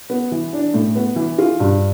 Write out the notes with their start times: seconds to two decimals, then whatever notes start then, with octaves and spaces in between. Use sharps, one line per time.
0.10 B3
0.32 E3
0.53 D4
0.74 A2
0.95 B3
1.16 E3
1.38 F4
1.60 G2